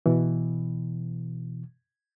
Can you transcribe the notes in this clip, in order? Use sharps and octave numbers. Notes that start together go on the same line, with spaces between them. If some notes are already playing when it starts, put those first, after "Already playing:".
B2 E3